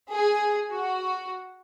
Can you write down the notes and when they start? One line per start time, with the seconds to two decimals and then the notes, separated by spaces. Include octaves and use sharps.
0.11 G#4
0.71 F#4